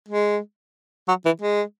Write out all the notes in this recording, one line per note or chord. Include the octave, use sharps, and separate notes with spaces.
G#3
F#3
E3
G#3